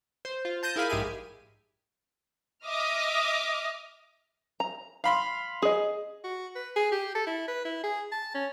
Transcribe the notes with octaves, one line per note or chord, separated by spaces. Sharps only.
C5
F4
A5 G6 A#6 D#7
E4 G#4 A#4 F5 B5
A#1 G#2 G4 E5 G#5 D#7
D#5 E5 D6 D#6 F6
A#5
F5 B5 C6
G#4 D#5
F#4
B4
G#4
G4
A4
E4
B4
E4
G#4
A5
C#4